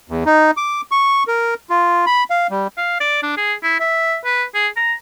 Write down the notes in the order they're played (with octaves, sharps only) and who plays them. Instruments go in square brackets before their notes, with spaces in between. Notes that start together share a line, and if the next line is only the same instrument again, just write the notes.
[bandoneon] E2
D#4
D6
C#6
A#4
F4
B5
F5
G3
[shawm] F5
D5
D4
G#4
E4
E5
B4
G#4
A#5